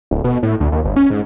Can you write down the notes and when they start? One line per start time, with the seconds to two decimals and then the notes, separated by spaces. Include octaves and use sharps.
0.11 D1
0.24 B2
0.43 A2
0.60 D2
0.72 D#2
0.84 G1
0.96 C#4
1.10 G#2